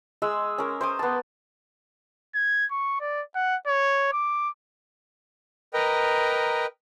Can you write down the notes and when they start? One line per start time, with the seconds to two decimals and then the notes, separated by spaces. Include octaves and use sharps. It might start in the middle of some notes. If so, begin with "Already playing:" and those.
0.22 G#3 G#4 E6
0.58 C#4 A#4
0.81 C5 D6 D#6
0.99 B3 A5
2.35 G#6
2.71 C#6
3.01 D5
3.35 F#5
3.67 C#5
4.13 D6
5.74 A#4 B4 D#5 G5 A#5